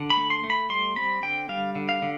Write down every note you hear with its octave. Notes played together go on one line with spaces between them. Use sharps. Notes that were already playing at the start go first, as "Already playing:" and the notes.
Already playing: D3
B5
A3
C6
A3
B5
G3 C6
C4 B5
D3 G5
G3 F5
D3
F5
D3